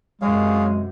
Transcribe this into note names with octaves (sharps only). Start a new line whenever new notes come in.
F#2 C3 G#3 G#4 C#5 F5